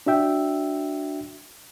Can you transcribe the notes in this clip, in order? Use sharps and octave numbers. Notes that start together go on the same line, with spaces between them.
D4 F#4 E5 G5